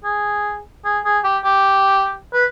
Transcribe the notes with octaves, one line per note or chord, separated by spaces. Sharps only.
G#4
G#4
G#4
G4
G4
B4